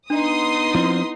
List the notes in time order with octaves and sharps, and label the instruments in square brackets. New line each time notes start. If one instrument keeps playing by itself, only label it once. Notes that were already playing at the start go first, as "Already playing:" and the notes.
[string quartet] B3 D#4 [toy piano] D4 [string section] C6 D#6
[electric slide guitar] F3 C4 [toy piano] E4